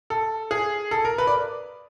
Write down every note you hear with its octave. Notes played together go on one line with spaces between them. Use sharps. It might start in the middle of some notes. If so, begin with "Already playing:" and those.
A4
G#4
A4
A#4
B4
D5